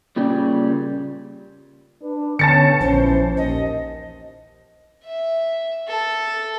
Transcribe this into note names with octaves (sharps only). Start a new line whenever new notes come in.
A#2 C#3 G3
D4 B4
D3 B3 C#4 A5 A6 C#7
A#1 E3 C#4 C5
D#2 D#5
E5
A4